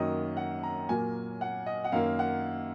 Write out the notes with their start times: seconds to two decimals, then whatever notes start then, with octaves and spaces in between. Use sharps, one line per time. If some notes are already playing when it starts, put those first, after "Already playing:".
Already playing: F#2 D#3 F#3 A#3 D#5
0.37 F#5
0.63 A#5
0.89 A#2 F#3 A#3 G#5
1.41 F#5
1.66 D#5
1.84 F#5
1.92 F#2 D#3 A#3 F5
2.19 F#5